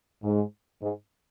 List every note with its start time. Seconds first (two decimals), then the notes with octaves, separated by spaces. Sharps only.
0.24 G#2
0.82 G#2